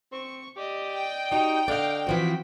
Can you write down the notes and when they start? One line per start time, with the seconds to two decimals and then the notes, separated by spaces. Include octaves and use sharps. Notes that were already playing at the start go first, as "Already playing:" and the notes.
0.12 C4 C#6
0.56 G4 D5 D#5
0.91 G5
1.31 D#4 F#4 G4
1.68 D3 D5 D#5 F5
2.07 E3 F3 C4 F#4 B6